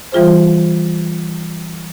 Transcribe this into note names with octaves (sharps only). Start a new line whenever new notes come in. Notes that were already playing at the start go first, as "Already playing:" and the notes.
E3 G3 F4 G#4 C5